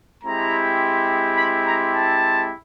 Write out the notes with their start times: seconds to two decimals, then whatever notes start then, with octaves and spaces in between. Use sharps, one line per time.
0.24 G#3 C4 E4 G4 A#5
1.38 B5
1.66 A#5
1.94 A5